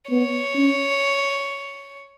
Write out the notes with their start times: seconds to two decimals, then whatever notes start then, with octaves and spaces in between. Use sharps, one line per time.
0.11 B3 C#5
0.56 C#4